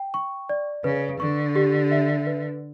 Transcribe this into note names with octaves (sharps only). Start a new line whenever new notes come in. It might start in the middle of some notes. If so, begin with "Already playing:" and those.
Already playing: G5
C#6
D5
C#3 B4
D3 C#6
G4
E5
B4